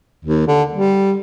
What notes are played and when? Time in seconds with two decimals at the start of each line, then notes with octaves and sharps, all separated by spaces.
0.25 D#2
0.47 D3
0.73 G3